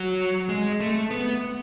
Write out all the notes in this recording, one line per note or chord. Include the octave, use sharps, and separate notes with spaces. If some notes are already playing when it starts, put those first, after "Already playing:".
Already playing: F#3
G#3
A3
B3